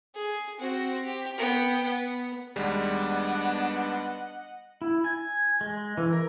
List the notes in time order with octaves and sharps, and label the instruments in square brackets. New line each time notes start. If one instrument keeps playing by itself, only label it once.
[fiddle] G#4
C4 F#4
G4
B3 G5
B3
[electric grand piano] D#2 G3 G#3 [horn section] B3 D4 [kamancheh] D#5 F#5
[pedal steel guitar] E4
G#5
G#3
E3
A#4